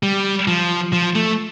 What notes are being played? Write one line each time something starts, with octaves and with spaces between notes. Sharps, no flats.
G3
F3
F3
A3